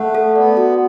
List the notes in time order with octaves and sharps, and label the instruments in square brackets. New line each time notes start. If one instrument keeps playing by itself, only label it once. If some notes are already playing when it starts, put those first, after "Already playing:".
Already playing: [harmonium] A3 [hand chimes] F#5
[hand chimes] A4
[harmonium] B3 [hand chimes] D5
[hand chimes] F#4